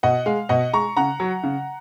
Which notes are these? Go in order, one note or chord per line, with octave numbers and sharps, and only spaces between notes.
B2 D#5 F#5
G#3 F5
B2 D#5 F#5
G#3 A#5 C#6
C#3 F#5 A#5
F#3
C#3